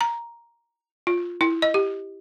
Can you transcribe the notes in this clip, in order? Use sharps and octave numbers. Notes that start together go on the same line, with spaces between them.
A#5
F4
E4
D#5
G4